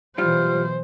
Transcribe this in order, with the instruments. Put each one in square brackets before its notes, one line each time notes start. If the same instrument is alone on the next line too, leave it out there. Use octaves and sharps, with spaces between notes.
[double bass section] B2 E3 F#3 [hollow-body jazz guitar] G3 F4 [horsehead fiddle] C5 [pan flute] F6